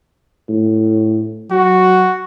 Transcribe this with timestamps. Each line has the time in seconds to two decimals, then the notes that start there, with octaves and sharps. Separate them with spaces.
0.49 A2
1.51 F#3 F#4